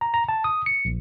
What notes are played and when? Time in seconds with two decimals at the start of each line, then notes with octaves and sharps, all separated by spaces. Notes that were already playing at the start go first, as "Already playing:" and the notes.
0.01 A#5
0.14 A#5
0.29 A5
0.44 D#6
0.66 C#7
0.85 A#1